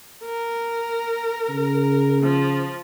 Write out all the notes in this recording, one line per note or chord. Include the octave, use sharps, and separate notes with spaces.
A#4
C#3
F3